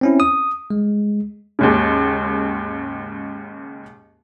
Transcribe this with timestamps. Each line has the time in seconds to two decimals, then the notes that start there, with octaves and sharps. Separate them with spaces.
0.01 C4 C#4 E4
0.20 D#6
0.70 G#3
1.59 D#2 G#2 C#3